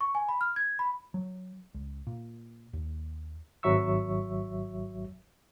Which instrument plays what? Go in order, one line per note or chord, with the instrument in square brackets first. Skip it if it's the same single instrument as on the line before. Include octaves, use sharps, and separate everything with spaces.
[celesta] C#6
G#5
B5
F6
G#6
B5
[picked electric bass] F#3
C#2
A#2
D#2
[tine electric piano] G#1 F#3 E5 C#6 E6